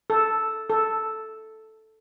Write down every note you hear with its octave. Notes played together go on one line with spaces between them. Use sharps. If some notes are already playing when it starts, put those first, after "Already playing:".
A4
A4